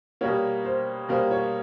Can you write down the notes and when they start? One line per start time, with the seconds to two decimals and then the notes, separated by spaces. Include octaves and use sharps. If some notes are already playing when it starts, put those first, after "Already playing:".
0.21 B2 G3 A#3 C#5
0.65 C5
1.09 B2 G3 A#3 C5
1.31 C#5